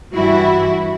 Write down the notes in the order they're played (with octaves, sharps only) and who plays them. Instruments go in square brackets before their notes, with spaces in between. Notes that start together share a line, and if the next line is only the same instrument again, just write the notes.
[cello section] G2 E3 G3 E4 F#4